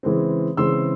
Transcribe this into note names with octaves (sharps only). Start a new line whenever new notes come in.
C#3 E3 G#3 C4
C#3 E3 G#3 C4 C6 E6